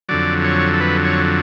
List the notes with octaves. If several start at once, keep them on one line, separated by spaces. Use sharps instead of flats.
F2 D3 F#3 D5
C#5
A4
B4
C#5